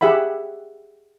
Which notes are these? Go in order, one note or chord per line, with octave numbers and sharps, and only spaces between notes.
G4 G#4 E5 F#5 B5